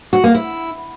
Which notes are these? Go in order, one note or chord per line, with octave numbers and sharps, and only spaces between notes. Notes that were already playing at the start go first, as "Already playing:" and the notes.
F#4
A#3
E4